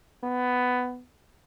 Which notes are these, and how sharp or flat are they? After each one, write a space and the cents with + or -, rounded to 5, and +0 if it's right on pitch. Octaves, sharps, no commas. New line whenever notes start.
B3 +10